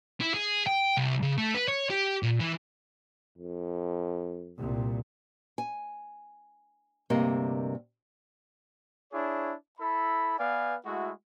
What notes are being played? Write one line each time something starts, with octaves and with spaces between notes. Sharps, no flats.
E4
G#4
G5
C2
C#3
A3
B4
C#5
G4
A#2
E3
F2
C2 A#2
G#5
D2 G2 C3 A#3 A#4 D#5
D4 E4 G#4 C#5
E4 A4 B5
B3 B4 D5 F5 G#5
G#3 A3 E4 F#4